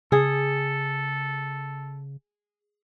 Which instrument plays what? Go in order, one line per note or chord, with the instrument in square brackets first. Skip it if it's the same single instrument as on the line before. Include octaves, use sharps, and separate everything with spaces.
[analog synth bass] C#3 [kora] G#4 [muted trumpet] A4